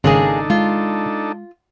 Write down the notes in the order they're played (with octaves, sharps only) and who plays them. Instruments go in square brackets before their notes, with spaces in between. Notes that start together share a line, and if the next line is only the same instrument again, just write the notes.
[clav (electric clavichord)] G#1 C#3 [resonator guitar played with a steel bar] G#3 A#3 G#4 [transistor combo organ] D4 D#4 A4
[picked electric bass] G#3 [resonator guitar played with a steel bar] F4